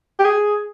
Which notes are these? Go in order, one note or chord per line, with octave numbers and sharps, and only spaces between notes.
G4
G#4